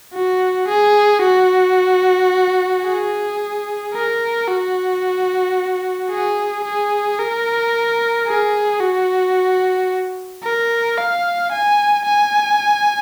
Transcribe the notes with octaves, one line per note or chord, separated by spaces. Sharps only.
F#4
G#4
F#4
G#4
A#4
F#4
G#4
G#4
A#4
G#4
F#4
A#4
F5
G#5
G#5